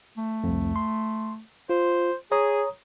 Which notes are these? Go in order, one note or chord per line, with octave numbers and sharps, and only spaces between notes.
A3
C2 F2
C6
F4 C5
G#4 C#5 A#5 D#6